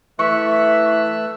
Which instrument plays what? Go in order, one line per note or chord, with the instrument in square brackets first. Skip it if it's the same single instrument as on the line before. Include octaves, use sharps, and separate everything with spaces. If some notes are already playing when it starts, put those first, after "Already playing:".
[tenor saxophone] E3 [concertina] A3 E6 F#6 [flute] E5 [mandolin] C#6